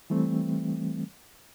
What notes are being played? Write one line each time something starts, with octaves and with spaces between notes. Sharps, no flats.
E3 G3 A3 C4